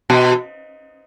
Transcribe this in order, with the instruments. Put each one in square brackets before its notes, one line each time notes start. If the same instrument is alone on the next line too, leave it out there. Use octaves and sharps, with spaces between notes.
[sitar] B2